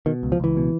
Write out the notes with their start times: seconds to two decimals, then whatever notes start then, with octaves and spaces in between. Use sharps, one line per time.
0.06 B2 D#3
0.23 C#2
0.32 F3
0.40 C#2 E3
0.57 B2